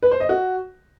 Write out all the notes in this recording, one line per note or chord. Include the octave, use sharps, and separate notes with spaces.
B4
C5
D#5
F#4